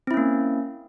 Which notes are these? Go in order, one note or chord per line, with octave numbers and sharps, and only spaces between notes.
A#3 C4 C#4 E4